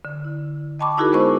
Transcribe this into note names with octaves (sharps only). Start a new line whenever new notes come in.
D3
E4
D#5 G5 A5 B5 C#6 D6
D#4 E4 F#4 G#4 A#4
G#3 B3 C5 D#5 C#6